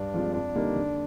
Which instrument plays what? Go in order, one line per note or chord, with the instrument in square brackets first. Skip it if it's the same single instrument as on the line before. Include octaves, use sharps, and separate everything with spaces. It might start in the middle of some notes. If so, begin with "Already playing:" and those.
Already playing: [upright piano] G2 [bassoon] D4
[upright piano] F3 G#3 C4 F4
[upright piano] F2 [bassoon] D4
[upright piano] D3 G3 A#3 D#4
D3